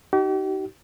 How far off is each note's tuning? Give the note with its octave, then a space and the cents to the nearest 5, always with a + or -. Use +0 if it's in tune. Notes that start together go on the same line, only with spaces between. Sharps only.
D#4 +0 G4 -45